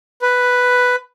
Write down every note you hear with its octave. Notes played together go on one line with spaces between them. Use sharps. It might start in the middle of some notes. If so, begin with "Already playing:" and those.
B4